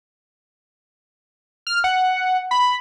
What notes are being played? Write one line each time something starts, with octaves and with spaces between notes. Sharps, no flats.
F6
F#5
B5